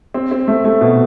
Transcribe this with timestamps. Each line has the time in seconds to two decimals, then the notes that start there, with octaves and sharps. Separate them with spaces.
0.14 C4
0.31 C4
0.48 A3
0.64 A3
0.81 B2